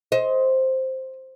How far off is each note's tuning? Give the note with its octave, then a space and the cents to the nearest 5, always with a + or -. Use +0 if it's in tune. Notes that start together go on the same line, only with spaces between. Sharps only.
C5 +0 D#5 +25